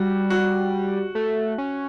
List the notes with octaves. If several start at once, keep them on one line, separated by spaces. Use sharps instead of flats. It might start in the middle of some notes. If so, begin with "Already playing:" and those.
Already playing: G3 F#4
F#4
A3
C#4